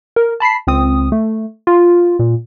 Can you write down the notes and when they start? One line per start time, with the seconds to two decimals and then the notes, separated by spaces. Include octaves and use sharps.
0.16 A#4
0.40 A5 B5 B6 C7
0.67 C#2 C4 D#6
1.12 A3
1.67 F4
2.19 A#2